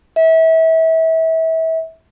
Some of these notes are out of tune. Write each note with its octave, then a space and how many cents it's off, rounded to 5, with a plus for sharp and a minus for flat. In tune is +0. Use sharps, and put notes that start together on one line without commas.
E5 -30